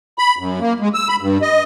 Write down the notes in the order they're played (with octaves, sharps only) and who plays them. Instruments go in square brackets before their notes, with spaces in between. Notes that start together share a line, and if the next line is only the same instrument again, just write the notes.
[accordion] B5
F#2
A#3
G#3
E6
B5
G2
D#5